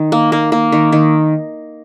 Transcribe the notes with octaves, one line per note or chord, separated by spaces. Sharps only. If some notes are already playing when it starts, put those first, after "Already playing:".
Already playing: D#3
A#3
A#3
A#3
D#3
D#3